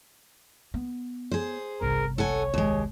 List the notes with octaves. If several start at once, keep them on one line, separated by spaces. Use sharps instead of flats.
B3
G#4 C5
G1 C2 A#4
A4 C#5 F#5 G#5
D#2 G#3